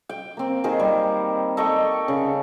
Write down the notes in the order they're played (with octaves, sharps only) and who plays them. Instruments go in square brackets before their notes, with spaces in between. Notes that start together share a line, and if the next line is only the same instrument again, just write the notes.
[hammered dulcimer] G5
A#3 C4
D#3 G#4 A#4 C5
G3
A4 D#5 G5 C#6
C#3